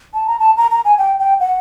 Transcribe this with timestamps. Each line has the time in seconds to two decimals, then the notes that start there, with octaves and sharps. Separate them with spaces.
0.14 A5
0.27 A#5
0.39 A5
0.57 A#5
0.71 A#5
0.85 G#5
0.98 G5
1.19 G5
1.40 F#5